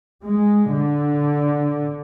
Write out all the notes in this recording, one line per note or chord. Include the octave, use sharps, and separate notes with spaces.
G#3
D3